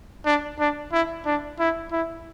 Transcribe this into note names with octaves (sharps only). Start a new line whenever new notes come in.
D4
D4
E4
D4
E4
E4